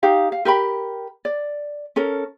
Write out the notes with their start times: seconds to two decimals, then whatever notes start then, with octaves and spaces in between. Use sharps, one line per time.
0.03 D#4 G4 F5
0.32 F5
0.45 G4 A#4 G5 B5
1.25 D5
1.96 C#4 A4 A#4